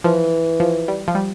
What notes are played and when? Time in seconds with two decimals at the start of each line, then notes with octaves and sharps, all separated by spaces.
0.04 E3 F3
0.60 F3
0.88 G3
1.08 F3
1.15 G3